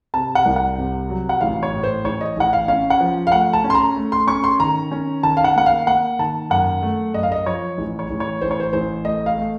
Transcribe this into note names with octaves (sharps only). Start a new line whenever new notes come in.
C3 A5
F#5
C2
F#5
C3
F#3
F#5
A1 F5
C#5
A2
C5
A1 C#5
D#5
A1 F#5
F5
C#4 F5
F#5
F3
F5
A3 F#5
A5
C#4
C6
A#5
A3
C6
C#4 C#6
C6
D#3 A#5
C#4
D#3 A5
F5
F#5
A#3 F#5
F5
A#3 F#5
D#3 A5
F#2 F#5
A3
F#2 D#5
F5
D#5
F3 C#5
A1
C#5
A1
C#5
A1 C5
C#5
C5
A1 C5
A3 D#5
F5
A3